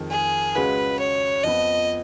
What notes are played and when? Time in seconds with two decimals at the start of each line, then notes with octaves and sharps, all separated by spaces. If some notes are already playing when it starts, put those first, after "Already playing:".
Already playing: F2 D#3 G#3
0.10 G#4
0.55 C#2 C#3 G#3 C#4 F#4 B4
0.99 C#5
1.44 F2 F3 B3 D#5